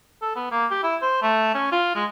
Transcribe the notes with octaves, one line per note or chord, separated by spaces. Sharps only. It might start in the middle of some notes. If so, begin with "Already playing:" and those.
A4
B3
A#3
G4
E4
C5
A3
C#4
F4
G#3